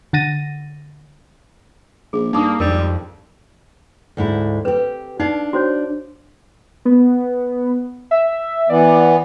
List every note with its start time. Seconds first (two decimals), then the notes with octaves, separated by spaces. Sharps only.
0.13 D3 F#5 A6 A#6 D#7
2.13 A#1 G#4
2.33 G2 A#3 D#4 D6 D#6
2.60 G#1 F2 G3 D4 A#4
4.17 D2 G#2 E4
4.65 C4 G4 B4
5.20 D4 D#4 F5
5.53 F#4 C5 C#5
6.85 B3
8.11 E5
8.70 E3 B3 D5